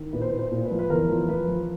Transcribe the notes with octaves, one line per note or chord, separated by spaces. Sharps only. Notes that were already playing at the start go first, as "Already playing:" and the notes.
Already playing: D#3
A#2 B4
C5
A#2 B4
C5
A#2
B4
F3
B4
E2 A#4
F3
F3 B4
F3